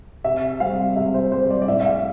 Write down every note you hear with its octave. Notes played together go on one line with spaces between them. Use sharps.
C3 E5
G3 C4 F5
C3 E5
C5
G3 C4 C5
D5
D5
A2 E5
E5
F5